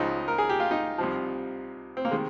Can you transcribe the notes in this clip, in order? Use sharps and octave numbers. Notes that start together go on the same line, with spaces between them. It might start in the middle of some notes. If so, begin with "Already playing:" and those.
Already playing: C#2 C#3 F3 D#4
A#4
G#4
G4
F4
D#4
C2 C3 F3
C4
A#3
C3 D#3 G#3